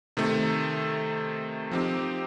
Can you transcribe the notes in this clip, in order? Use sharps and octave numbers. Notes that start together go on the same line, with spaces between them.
C3 D#3 A3
F3 C4 D#4 G4